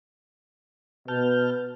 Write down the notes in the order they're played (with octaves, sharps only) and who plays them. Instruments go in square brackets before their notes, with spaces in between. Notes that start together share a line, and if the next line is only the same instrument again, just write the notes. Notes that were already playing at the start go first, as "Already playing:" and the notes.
[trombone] B2 [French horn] B4 [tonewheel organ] A5 F6 G6